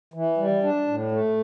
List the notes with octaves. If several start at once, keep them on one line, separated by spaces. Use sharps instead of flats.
E3
G3
D4
A2
A3